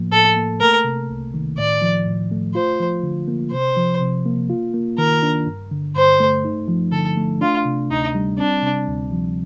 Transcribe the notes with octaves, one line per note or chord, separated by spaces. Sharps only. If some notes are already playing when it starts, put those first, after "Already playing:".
Already playing: A2 F3 A#3
A2 A4
A#3
A3 A#4
C3
C2
D#3
A2 D5
F3
A2
A3
F4 C5
F3
D3
A#3
C3 C5
F3
C3
A#3
F4
A#3
D#3 A#4
D4
G2
D3
G2 C5
A3
D#4
F3
D3 A4
A3
D4 F4
C3
D2 D#4
G3
C4 D4
C3
D2
F3